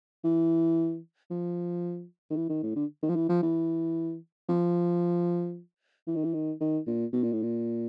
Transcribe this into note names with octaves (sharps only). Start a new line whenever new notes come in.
E3
F3
D#3
E3
D#3
A2
D3
D#3
F3
E3
F3
E3
F3
E3
D#3
E3
D#3
D#3
A#2
B2
A#2
A2
A#2